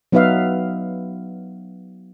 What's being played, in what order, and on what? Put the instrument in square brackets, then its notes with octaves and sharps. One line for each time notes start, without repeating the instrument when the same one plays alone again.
[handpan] F#3 B3 D#4 B4 E5 F5